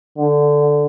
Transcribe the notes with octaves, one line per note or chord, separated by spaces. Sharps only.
D3